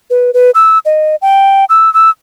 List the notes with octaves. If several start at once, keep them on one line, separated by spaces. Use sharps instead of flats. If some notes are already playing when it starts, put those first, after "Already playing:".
B4
B4
E6
D#5
G5
E6
E6